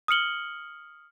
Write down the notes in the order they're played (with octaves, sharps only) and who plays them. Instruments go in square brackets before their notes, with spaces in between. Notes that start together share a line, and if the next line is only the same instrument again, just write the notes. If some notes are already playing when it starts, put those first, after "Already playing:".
[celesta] D#6 F6 C#7 F#7 G7